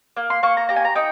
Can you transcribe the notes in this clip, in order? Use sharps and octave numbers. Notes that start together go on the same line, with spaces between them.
A#3
C6
A#3 C#6
A#5
G4 A#5
G#5
A#5
D#4 G5